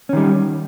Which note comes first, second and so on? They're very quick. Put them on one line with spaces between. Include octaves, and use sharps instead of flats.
C#4 D#3 G3